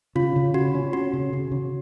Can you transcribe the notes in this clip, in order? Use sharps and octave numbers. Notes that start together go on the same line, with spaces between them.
C#3 F4
C#3
C#3 F#4
C#4
C#4 F#4
C#3
C#3
C#3